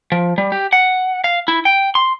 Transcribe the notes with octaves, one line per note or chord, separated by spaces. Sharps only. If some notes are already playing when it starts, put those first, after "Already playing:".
F3
G3
G4
F#5
F5
E4
G5
C6